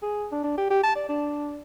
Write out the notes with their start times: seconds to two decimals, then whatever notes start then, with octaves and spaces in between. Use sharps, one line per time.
0.02 G#4
0.32 D4
0.44 D4
0.57 G4
0.70 G4
0.83 A5
0.95 D5
1.09 D4